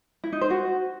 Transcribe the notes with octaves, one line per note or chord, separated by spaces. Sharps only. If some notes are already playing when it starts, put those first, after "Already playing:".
E4
D#4
C5
F#4